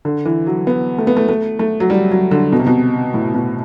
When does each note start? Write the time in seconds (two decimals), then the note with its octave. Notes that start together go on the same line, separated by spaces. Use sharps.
0.05 D3
0.25 E3
0.47 F#3
0.67 B3
0.98 A3
1.07 B3
1.17 A3
1.29 A3
1.59 A3
1.80 F#3
1.90 G3
2.12 F#3
2.31 D3
2.52 B2
2.59 C3
2.67 B2
3.14 A2
3.34 B2